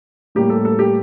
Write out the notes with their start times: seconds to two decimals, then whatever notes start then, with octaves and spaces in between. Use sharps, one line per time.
0.35 A2 G3 A#3 G4
0.50 A4
0.65 A4
0.79 G4